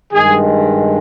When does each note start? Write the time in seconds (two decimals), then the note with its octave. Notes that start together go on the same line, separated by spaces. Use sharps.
0.13 G2 D#3 G#3 G#4